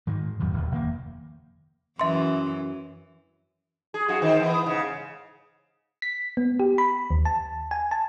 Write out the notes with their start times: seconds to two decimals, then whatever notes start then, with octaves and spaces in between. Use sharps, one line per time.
0.07 G#2 D#3 G#3
0.39 D1 F2 D#3 F#3
0.53 D#1 D#2
0.71 F1 D#3 A#3
2.00 F#2 E3 E5 C6
3.94 G#4
4.08 F#2 F4 F#4
4.22 D#3 C4
4.40 E3 B3
4.64 G#2 C#3
6.02 B6
6.37 B3
6.60 G4
6.78 B5
7.10 D#2
7.25 A5
7.71 G#5
7.91 A5